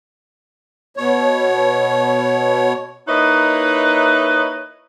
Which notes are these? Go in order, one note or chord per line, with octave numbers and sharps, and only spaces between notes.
B2 C#5
A#3 D#4 E4 B4 C#5 D#5